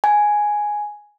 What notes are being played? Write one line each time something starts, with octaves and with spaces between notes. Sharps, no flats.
G#5